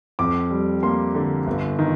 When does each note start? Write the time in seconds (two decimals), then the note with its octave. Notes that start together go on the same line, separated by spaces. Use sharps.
0.19 F2 D6
0.51 G3
0.83 A#3 C6
1.15 D3
1.47 G1
1.79 D#3